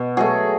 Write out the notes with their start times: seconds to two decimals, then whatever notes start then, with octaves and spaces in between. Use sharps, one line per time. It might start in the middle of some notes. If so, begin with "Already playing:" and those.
Already playing: B2
0.17 F#3 A3 G#4